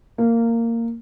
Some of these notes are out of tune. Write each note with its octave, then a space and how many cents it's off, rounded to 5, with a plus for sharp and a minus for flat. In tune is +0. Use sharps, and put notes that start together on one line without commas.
A#3 -15